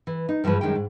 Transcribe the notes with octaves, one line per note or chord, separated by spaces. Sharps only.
E3
D#4
G2 E3 F3 G#3 B4
F#2 A2 D#3 G#3 G4 G5
G#2